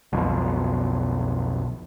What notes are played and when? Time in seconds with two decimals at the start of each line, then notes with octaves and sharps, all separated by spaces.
0.13 B1 F2 B2